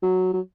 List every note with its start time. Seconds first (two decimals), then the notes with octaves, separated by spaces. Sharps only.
0.03 F#3
0.33 F#3